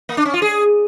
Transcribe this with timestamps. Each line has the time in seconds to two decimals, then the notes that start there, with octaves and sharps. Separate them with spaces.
0.09 A#3
0.17 D4
0.25 C#4
0.34 F4
0.42 G#4